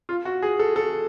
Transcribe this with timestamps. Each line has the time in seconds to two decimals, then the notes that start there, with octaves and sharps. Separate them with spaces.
0.09 F4
0.25 F#4
0.42 G#4
0.59 A4
0.76 A4